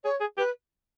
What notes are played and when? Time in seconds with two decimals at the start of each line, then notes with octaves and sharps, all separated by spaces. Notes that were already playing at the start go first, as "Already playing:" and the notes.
0.04 G#4 C#5
0.21 G#4
0.38 G4 B4